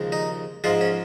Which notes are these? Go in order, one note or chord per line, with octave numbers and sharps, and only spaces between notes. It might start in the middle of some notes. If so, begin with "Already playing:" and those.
Already playing: D#2 C#3 F3 G#3
D#4
G#2 F3 G#3 F4
C#4